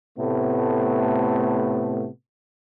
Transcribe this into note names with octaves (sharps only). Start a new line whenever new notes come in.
A2 C3 A3 B3